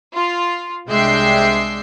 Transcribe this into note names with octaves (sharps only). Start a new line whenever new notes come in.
F4
C2 G#3 D4 E5 G5 C7